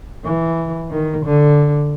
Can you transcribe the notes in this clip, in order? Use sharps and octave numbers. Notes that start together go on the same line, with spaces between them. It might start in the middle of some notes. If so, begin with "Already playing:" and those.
E3
D#3
D3